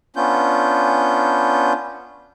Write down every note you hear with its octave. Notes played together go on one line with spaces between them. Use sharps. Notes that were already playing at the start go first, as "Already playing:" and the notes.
B3 C#4 D4 F4 G6